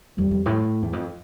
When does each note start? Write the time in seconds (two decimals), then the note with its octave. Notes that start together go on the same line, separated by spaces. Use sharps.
0.18 F2 G3
0.31 F2
0.46 A2
0.82 E2
0.93 F2